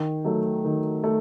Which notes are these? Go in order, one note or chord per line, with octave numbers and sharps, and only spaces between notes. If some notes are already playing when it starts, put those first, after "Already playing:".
Already playing: D#3
F#3 A3
D#3
A3